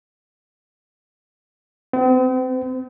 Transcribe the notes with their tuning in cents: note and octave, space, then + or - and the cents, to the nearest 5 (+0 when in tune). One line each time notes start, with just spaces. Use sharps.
C4 -45